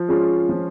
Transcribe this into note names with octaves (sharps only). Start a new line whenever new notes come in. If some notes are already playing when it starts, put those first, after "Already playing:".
Already playing: F3
G#3 C#4 F4
F3